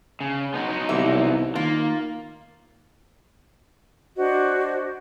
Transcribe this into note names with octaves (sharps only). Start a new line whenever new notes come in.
C#3
B3 D#4 F#4
C2 E3 E5
D#3 A#3 F4
D4 F#4 C5 D#5